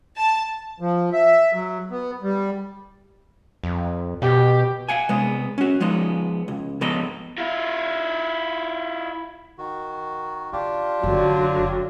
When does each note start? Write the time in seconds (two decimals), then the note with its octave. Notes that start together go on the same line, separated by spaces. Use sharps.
0.17 A5
0.80 F3
1.13 E5
1.53 F#3
1.91 B3
2.23 G3
3.64 F2
4.22 B2 G4
4.89 F5 F#5 G#5
5.09 C3 G#3 B3
5.58 C#4 F#4
5.80 F3 G#3 B3 D#4
6.48 C#2
6.81 G#2 F3 B3 A4 D#5 A#5
7.38 E4 F4
9.58 D#3 F#4
10.53 D3 D4 F4 G4
11.03 F#1 D3 F#3